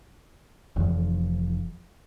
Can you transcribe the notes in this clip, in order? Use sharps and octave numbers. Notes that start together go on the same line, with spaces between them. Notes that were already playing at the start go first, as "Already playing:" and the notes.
F1 F2 E3 F3